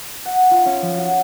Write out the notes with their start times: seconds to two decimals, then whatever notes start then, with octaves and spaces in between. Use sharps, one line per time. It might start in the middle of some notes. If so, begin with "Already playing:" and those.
0.26 F#5
0.51 F4
0.66 C#4
0.82 F3
0.98 F#4